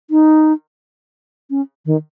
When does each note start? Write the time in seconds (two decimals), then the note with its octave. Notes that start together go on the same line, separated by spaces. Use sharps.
0.10 D#4
1.50 C#4
1.86 D#3